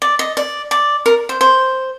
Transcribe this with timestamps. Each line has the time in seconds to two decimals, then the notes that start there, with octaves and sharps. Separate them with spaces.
0.02 D5
0.19 D#5
0.37 D5
0.71 D5
1.06 A#4
1.29 C5
1.41 C5